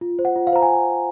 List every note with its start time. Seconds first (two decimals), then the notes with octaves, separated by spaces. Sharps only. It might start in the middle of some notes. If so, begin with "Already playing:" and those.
0.01 F4
0.19 C5
0.25 F#5
0.36 F4
0.47 F5
0.53 C5 A#5
0.62 G#5